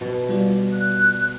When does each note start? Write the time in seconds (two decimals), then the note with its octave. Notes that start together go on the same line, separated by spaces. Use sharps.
0.01 B2
0.29 G3 F4 D5
0.73 F#6